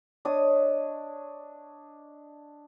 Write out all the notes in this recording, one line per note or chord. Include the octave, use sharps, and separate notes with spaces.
D4 C#5 D#5 D#6